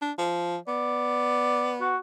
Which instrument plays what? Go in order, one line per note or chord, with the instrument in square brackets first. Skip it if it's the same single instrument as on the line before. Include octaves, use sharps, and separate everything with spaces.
[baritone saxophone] D4
F3
[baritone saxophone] B3 [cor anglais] D5
[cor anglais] F#4